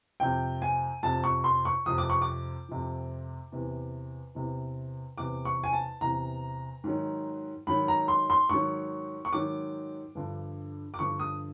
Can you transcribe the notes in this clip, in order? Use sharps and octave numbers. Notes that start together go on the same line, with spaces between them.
F2 C3 F3 G5
G#5
F2 C3 F3 A5
C#6
C6
C#6
F2 C3 F3 D#6
D6
C#6
D6
F2 C3 F3
E2 C3 E3
E2 C3 E3
E2 C3 E3 D6
C#6
G#5
A5
E2 C3 E3 A#5
G#2 D#3 F#3
G#2 D#3 F#3 B5
A#5
C6
C6
G#2 D#3 F#3 C#6
C#6
G#2 D#3 F#3 D6
G2 D3 F3
D6
G2 D3 F3 C#6
D#6